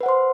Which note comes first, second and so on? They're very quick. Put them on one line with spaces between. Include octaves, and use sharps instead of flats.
B4 F#5 C5 C6